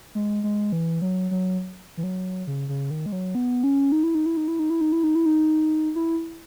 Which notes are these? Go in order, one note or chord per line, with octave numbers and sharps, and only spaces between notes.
G#3
G#3
E3
F#3
F#3
E3
F#3
C#3
C#3
D#3
G#3
F#3
B3
C#4
D#4
E4
D#4
E4
D#4
E4
D#4
E4
D#4
E4
D#4
E4
D#4
E4